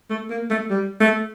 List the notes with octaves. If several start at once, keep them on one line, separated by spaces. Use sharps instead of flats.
A3
A#3
A3
G3
A3